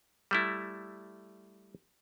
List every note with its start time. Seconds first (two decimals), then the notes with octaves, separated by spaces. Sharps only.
0.31 G3 A3 E4